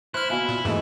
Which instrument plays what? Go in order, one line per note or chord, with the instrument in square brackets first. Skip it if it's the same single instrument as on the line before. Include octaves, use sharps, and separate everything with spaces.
[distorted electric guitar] E4 [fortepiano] C5 [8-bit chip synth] F6 F#6
[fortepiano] B2 F5 G#5 [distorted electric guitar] E4
[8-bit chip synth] A#2
[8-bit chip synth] F2 G#2 [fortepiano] E3 G#3 A3